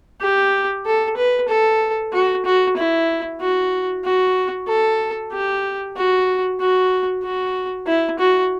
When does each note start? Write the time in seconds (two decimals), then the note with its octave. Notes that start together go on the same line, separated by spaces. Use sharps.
0.21 G4
0.86 A4
1.17 B4
1.48 A4
2.13 F#4
2.45 F#4
2.77 E4
3.41 F#4
4.04 F#4
4.67 A4
5.32 G4
5.96 F#4
6.60 F#4
7.23 F#4
7.87 E4
8.19 F#4